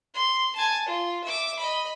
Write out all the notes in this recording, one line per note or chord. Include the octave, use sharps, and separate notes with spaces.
C6
G#5 A5
F4
E5 D6
D#5 B5